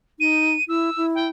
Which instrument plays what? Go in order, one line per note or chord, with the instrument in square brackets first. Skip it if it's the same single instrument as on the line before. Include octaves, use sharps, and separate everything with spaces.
[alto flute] D#4 [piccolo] D#7
[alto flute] E4 [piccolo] E6
[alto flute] E4
[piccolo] G5